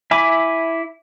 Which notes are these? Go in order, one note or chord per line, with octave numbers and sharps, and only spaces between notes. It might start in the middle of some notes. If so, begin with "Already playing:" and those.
E4 E5 G#5 B5 D6